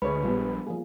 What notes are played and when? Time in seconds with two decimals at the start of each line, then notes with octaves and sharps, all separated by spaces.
0.02 D2 G#3 B4 C#5 B5
0.23 A#1 G3 B3
0.67 F3 A#3 G#4